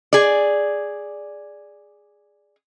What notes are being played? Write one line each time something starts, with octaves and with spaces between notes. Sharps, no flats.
G#4 D5